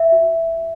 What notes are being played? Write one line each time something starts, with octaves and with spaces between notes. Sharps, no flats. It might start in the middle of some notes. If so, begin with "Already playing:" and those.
Already playing: E5
F#4